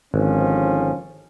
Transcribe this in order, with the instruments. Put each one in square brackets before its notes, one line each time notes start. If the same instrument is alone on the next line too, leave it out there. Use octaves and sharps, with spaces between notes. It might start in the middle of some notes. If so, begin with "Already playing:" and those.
[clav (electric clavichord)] G#1 [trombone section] D3 F3 C#4